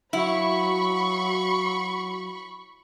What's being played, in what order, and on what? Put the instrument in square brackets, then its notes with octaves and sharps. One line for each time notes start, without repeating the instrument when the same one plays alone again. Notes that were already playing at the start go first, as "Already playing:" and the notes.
[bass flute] F#3 [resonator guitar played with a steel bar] E4 [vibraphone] F5 F#5 [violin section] B5 C#6